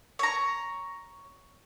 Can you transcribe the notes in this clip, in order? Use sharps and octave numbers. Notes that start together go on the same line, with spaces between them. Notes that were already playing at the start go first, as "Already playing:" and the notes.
C#5 A#5